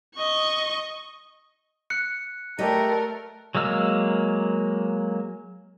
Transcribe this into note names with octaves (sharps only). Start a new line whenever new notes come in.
D#5 C#6
F#6 C#7
A3 G4 A#4 D#5
F#3 G#3 A#3 E6 F6